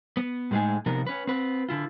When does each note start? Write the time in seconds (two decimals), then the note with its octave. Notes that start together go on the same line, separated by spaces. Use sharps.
0.17 B3
0.51 A2 G#3 D#4 G#4
0.86 C3 F3 B3 D#4 A#4
1.07 C#4 B4
1.27 C4 B4
1.69 D3 E4 F4